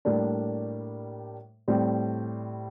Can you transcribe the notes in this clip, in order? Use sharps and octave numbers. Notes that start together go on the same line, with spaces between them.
A2 G3 A#3 D4
A2 G3 C4